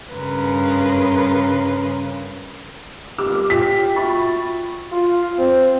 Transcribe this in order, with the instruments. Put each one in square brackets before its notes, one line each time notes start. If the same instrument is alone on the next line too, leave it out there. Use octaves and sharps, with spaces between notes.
[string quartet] G2 C#3 A#4 B4 C6
[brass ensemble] G1 F2 D#3 [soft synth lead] G4 [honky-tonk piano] D6 E6 F6
[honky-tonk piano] F4 [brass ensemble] G5 [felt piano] B6
[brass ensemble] F4 F#4 E5 [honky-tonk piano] B5 C#6 [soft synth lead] A6
[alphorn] F4
C4